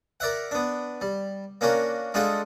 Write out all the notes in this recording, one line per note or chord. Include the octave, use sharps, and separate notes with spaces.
A#4 D5 E5 F#5
B3 D4
G3
A#3 C#4 D4 F#4 A#4
G#3 D4 D#4 F4 A4 F#5